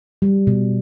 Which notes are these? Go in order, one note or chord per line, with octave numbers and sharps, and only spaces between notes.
G3
B2